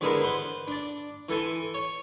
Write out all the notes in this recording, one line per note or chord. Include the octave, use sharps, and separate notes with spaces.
E2 D3 G#3 B3 G#4 A#4
B4 C5
D4 D5
E3 A4 G#5 C6
C#5